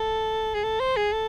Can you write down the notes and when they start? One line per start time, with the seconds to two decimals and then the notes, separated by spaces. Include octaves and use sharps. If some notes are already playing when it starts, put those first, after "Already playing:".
Already playing: A4
0.54 G#4
0.64 A4
0.80 C5
0.96 G#4
1.13 A4